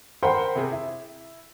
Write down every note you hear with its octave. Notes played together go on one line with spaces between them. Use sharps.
A#4 C5 F#5 G5 B5 C6
C3 G#4
E4